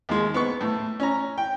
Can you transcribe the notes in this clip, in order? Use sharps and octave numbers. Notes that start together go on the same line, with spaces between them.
D#2 G#3
B3 C#6
A2
C#4 A#5
G5